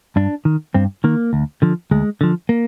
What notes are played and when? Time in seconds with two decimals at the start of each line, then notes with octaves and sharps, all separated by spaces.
0.16 G2 D4
0.45 D#3
0.74 G2 C4
1.04 D#3 A#3
1.33 D2
1.62 D3 F3
1.91 D2 G#3
2.21 D3 F3
2.49 A#3